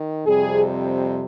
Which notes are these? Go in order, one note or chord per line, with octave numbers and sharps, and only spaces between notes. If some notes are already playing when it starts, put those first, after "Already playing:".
Already playing: D#3
F2 C3 G3 G#4